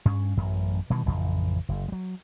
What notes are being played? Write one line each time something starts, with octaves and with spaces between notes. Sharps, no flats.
G2 C#4
A1 F#2
B2 D#3 E3 G3
A1 F2 C#3
F#1
F#3 G3